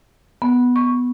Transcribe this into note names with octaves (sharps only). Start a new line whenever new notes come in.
B3
C#6